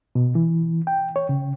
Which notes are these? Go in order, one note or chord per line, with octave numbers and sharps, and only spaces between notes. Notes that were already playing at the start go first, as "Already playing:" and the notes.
B2
E3
G5
C#5
C#3